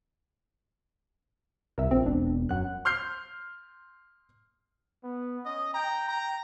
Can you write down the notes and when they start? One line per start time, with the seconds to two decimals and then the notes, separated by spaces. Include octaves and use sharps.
1.78 C2 A#4 E5
1.91 A#1 C4
2.06 E1 D4
2.49 F#2 F#5 F#6
2.85 C6 F6 G6 C7
5.03 B3
5.45 C#4 D#5
5.74 G5 A#5
6.08 A#5